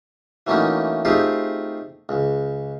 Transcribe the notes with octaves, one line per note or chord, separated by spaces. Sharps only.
E3 F#3 A3 A#3 C#4 D#4
A3 C4 D#4 F4 G4 G#4
C#2